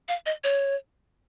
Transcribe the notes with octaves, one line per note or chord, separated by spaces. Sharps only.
F5
D#5
C#5